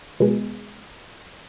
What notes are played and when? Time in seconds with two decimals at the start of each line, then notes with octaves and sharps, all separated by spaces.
0.20 B2 G#3